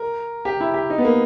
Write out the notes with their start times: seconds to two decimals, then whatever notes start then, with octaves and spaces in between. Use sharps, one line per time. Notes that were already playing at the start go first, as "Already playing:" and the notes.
Already playing: A#4
0.45 G4
0.60 E4
0.74 G4
0.90 D#4
0.98 B3
1.05 A#3